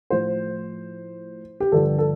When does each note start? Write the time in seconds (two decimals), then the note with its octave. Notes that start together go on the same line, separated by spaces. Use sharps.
0.10 A2 F3 C5
1.60 G4
1.72 G2 D3 F3 A4
1.98 A4